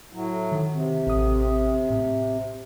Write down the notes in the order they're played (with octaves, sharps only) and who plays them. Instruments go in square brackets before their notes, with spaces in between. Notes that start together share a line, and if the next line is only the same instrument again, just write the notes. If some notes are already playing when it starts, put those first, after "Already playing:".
[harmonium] A2 F#3
[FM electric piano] D#3
[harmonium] C3 [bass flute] C4
[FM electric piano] A1 D#6
A2